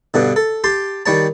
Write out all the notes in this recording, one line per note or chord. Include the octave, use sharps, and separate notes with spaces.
G2 B2 D3
A4
G4 A5 C6
D#3 G3 C#5 A5